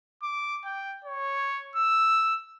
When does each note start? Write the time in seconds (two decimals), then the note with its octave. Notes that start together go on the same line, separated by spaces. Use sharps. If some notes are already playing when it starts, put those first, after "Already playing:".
0.23 D6
0.65 G5
1.05 C#5
1.76 E6